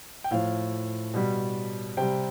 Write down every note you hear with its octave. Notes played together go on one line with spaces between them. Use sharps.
G5
A2 F3 F5
B2 G3
C3 G3 G5